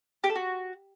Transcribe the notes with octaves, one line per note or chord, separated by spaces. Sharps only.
G4
A4
F#4